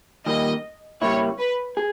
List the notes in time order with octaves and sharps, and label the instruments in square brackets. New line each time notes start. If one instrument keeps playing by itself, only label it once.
[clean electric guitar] D#3 G3 A#3 [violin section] D#5
[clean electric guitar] C#3 G3 A#3 E4 [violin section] C#5
[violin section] B4
[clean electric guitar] G#4